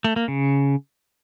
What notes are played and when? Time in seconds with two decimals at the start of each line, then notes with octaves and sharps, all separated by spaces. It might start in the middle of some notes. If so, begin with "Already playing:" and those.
0.05 A3
0.16 A#3
0.28 C#3